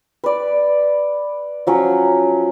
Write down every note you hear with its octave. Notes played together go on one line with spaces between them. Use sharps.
B4 D5
F3 F#3 C#4